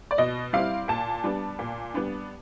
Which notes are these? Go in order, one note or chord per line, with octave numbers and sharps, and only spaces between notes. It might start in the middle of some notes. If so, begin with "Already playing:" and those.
D5
B2 D#5
G3 C4 E4 F5
A#2 A5
G3 B3 D4
A#2
G3 B3 D4